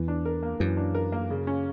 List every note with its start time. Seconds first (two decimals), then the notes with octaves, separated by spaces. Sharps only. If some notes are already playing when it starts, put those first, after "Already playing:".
Already playing: E2 E3
0.08 D4
0.25 A#4
0.43 A#3
0.60 F#2 E3
0.77 D4
0.95 A#4
1.12 A#3
1.30 C#3
1.47 C#4